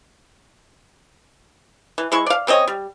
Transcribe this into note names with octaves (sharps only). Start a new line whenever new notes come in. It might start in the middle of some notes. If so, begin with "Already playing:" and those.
E3
G#3 E4 C#6
D5 F5
C#3 C4 C#5 D#5
G3